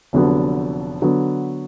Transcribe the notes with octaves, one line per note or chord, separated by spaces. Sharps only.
F1 F2 D3 F#3 B3
D3 F#3 B3